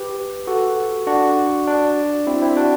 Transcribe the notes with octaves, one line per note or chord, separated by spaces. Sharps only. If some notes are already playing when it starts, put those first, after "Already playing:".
Already playing: G4 B4
F#4 A4
D4 F#4
D4
C4 E4
C4 E4
D4 F#4